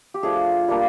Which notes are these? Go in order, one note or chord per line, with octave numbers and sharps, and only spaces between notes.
G4
F3 A3 D4 G#4
G3 A#3 D4 F4